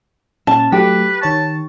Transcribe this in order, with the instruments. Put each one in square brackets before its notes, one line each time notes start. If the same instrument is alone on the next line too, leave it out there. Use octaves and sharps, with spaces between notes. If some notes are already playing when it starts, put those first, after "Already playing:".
[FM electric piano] A#2 C#4 A6 [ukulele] A5
[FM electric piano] F#3 A3 [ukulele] G4 [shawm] B4
[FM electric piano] D#3 C#5 C#6 [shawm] A5